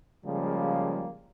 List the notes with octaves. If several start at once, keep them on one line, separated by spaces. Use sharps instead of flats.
C#3 F3 G3 G#3 A#3